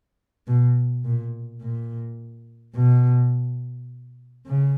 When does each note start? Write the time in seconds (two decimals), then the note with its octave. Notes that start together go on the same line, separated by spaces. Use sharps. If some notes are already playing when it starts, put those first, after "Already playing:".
0.47 B2
1.05 A#2
1.61 A#2
2.75 B2
4.47 C#3